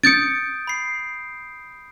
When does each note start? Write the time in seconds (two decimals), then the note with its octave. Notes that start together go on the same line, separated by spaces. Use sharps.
0.03 D#6 G6 A6 C#7 D7
0.67 B5 C7